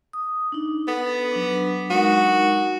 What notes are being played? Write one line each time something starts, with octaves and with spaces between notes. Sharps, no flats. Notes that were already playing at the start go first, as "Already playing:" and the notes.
D#6
D4 D#4
B3 A4
F#3 D4
G#3 D#4 F#4 A#4